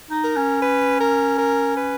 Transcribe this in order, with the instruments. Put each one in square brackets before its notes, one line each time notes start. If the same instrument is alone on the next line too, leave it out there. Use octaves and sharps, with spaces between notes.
[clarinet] D#4
[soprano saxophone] A#4
[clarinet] C#4
[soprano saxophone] B4
A#4
A#4
B4